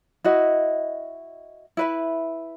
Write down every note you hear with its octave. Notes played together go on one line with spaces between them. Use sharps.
E4 F#4 D#5
E4 B4 E5